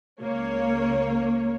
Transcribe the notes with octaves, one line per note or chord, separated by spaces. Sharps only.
C#2 A#3 C#5